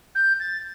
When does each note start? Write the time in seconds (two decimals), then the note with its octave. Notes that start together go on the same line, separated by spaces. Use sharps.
0.15 G6
0.40 A6